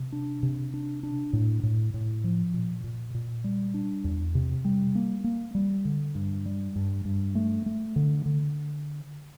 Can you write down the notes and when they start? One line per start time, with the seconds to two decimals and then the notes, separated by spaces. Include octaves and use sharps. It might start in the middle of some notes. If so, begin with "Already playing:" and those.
Already playing: C3
0.12 D4
0.43 C3
0.74 D4
1.03 D4
1.33 A2
1.63 A2
1.94 A2
2.24 F3
2.54 A#2
2.84 A#2
3.14 A#2
3.44 G3
3.74 D4
4.04 E2
4.35 C3
4.65 G3
4.95 A#3
5.24 A#3
5.55 G3
5.85 D3
6.15 G2
6.46 G3
6.76 G2
7.05 G2
7.35 A3
7.66 A3
7.96 D3
8.26 D3